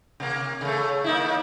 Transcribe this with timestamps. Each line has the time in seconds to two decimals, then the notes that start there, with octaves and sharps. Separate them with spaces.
0.20 C3 A#3
0.61 C#3 A3
1.04 A#3 D#4 E4
1.19 A#3